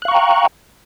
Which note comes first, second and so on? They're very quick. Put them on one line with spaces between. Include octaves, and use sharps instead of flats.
F#6 F5 C#6 A#5 G5